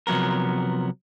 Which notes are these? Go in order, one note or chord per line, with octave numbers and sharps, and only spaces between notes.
C3 F3 F#3 B3 A#4